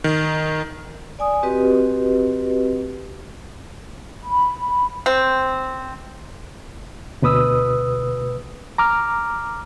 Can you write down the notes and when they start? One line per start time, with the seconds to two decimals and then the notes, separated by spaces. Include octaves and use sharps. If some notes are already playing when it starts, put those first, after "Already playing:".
0.04 D#3
1.19 D5 G#5 D#6
1.43 C4 F#4 G4 B4 D#5
4.24 B5
5.06 C4
7.22 D2 B2 B4 D#6 E6
8.78 A#5 D6 F6